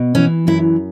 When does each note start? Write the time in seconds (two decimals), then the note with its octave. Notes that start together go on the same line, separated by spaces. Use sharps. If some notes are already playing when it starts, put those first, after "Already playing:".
Already playing: B2
0.15 E3 C#4
0.47 F#2 E4